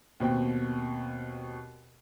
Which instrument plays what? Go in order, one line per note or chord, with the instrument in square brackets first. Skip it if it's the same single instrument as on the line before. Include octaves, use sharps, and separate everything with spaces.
[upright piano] D#2 B2 C4 G5